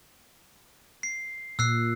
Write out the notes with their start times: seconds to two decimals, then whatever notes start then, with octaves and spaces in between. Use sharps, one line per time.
1.03 C7
1.59 A#2 E6 F#6 C7